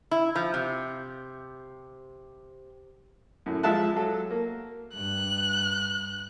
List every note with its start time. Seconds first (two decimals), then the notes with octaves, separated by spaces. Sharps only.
0.11 E4
0.36 F3
0.54 C3
3.46 F#2 A2
3.63 F3 G#3 E5 F5 A5 F#6
3.96 F#3 A4
4.31 A#3
4.95 G2 F#6